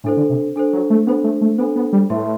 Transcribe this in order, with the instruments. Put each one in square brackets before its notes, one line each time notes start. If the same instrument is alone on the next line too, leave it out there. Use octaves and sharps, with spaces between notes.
[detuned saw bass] A2 [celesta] D4 A4 C5
[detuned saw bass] D3
C3
[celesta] D4 A4 C5
[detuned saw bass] F#3
A3
[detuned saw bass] B3 [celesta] D4 A4 C5
[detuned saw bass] A3
A3
[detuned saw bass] B3 [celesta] D4 A4 C5
[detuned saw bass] B3
G3
[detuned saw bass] A2 [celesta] B4 E5 A5 C6